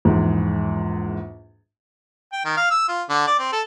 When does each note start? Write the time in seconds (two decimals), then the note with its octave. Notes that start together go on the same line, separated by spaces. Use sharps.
0.05 A#1 E2 G#2
2.33 G5
2.45 D#3
2.57 F5
2.71 E6
2.88 F4
3.09 D3
3.27 D5
3.39 C4
3.52 A4